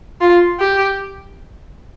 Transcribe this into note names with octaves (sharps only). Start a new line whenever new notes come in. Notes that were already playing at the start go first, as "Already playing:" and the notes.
F4
G4